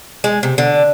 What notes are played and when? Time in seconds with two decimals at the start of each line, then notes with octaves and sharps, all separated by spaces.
0.24 G#3
0.43 C3
0.58 D3